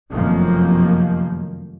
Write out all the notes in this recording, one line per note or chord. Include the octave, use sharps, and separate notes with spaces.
F1 F#2 C3 D#3 F3 A#3